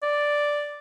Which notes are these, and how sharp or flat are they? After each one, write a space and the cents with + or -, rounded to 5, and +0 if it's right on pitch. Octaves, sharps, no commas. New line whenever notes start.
D5 +0